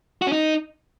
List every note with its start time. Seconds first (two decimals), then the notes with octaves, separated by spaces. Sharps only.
0.22 F#4
0.27 C#4
0.32 D#4